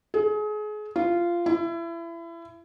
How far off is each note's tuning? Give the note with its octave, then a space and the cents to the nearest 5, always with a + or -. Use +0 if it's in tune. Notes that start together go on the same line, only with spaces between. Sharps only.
G#4 +30
F4 -15
E4 +30